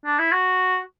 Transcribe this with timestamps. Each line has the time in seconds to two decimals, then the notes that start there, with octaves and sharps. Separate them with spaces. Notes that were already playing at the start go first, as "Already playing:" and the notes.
0.06 D4
0.19 E4
0.32 F#4